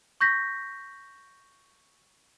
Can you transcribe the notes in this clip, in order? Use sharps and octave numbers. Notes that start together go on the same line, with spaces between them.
C#6 G6 A#6 B6